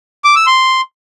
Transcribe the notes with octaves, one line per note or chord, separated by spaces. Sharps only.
D6
E6
C6